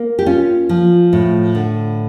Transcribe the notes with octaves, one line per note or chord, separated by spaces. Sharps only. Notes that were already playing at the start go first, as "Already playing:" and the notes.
Already playing: A#3
G4
C#4 F4
F3
A2
D3